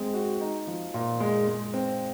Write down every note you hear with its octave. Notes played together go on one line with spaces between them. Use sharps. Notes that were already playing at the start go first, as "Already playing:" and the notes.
Already playing: G#3 C4
F#4
D#4
F3
A#2
G#3
G#3
C4